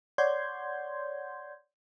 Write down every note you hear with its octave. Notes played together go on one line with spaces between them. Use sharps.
C#5 D5 F#5 C6 G6 G#6